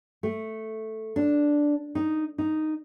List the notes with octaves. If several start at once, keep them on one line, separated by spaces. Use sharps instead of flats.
A3
D4
D#4
D#4